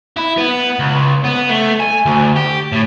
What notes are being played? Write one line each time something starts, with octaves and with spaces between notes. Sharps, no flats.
E4
B3
C#2
B3
A3
G#5
D2
G4
A2